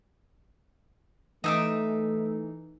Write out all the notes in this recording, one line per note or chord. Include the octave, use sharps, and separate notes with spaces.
E3 A3 D#4 D#5 E5 D6